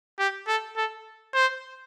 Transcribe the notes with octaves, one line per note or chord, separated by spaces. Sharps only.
G4
A4
A4
C5